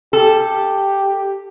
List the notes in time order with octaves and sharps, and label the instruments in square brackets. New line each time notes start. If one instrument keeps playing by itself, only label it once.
[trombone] G4 [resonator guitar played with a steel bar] A4